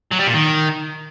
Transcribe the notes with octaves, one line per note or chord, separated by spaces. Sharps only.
F#3
G3
A#2
D#3